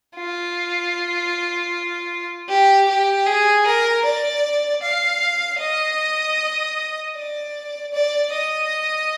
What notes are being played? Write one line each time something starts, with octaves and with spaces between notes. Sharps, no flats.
F4
G4
G4
G#4
A#4
D5
F5
D#5
D5
D5
D#5